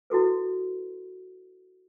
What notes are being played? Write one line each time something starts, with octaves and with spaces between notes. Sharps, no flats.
E4 F#4 A4 B4